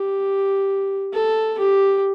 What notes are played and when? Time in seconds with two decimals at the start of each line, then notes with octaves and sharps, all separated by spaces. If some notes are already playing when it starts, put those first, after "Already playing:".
Already playing: G4
1.13 A4
1.58 G4